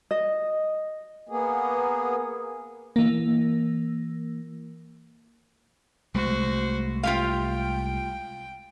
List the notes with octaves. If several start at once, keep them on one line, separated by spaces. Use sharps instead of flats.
D#5
A#3 B3 G#4
E3 A#3
C2 G#3 A3 F#4 C5
F4 G4 F5 G5